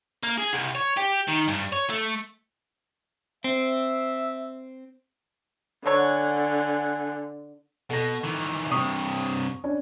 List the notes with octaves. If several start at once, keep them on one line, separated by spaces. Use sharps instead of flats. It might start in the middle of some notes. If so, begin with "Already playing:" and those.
A#3
G#4
C2
C#5
G4
D#3
G2
C#5
A3
C4 E5
D3 F#3 A4 C#5 F#5 G#5
B2 A4 A#6
D#3 E3
G2 C3 C#6 D#6
C#4 D4